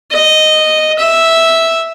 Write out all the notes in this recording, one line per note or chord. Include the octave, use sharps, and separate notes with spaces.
D#5
E5